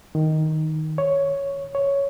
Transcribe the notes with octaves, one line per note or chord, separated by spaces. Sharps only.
D#3
C#5
C#5